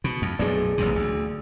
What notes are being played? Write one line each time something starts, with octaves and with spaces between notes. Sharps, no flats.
B2
F2
B1 F#2 A2 G#4 D5
A1 E2 C3
D2